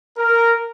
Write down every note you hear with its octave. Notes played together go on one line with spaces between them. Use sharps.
A#4